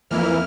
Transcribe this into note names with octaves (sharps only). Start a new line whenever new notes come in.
F2 E3 A#3 E4 F6